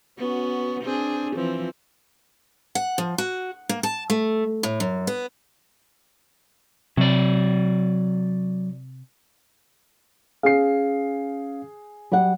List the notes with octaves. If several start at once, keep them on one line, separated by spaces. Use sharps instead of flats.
B3 C#4 F#4
C4 D4 G#4
E3 F3 C4
F#5
F3
F#4
A#3
A5
A3
A2
F#2
B3
C3 F#3 D5
C#4 G#4 F5 C7
F#3 G3 F#5